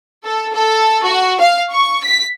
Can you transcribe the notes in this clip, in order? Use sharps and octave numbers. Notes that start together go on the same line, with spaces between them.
A4
A4
F#4
F5
C#6
B6